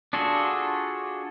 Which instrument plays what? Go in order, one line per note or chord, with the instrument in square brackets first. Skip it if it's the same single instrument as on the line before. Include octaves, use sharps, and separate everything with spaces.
[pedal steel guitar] D4 F4 F#4 G#4 A4